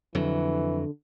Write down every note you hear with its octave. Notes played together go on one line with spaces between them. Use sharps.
F2 D3 E3 F#3